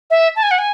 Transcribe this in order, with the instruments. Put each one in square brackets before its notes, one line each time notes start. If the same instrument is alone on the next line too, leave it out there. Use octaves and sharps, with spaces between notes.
[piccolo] E5
A5
G#5
F#5
G#5